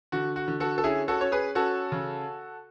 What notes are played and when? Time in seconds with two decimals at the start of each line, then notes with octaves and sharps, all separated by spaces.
0.12 D3 F#4
0.36 F#4
0.48 D3
0.60 F#4 A4
0.78 A4
0.84 C#4 E4 G#4
1.08 F#4 A4
1.20 C#4 C#5
1.32 G#4 B4
1.55 C#4 F#4 A4
1.92 C#3